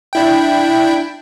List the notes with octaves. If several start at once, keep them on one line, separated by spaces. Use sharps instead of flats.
D4 E4 G5